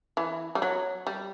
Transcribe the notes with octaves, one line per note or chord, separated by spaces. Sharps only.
E3
G3
F#3
G3